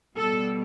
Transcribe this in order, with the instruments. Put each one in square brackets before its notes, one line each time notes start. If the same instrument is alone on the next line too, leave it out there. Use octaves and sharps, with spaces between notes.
[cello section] B2 G3 A4